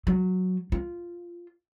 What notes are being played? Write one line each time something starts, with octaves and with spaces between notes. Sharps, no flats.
F#3
F4